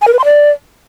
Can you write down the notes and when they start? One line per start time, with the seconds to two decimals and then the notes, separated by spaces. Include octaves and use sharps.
0.02 G#5
0.07 A#4
0.13 B4
0.19 C6
0.25 D5